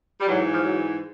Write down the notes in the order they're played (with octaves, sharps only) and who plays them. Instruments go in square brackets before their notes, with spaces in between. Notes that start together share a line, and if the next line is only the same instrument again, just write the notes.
[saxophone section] G3
G#2 E3 F#3
F3
F#3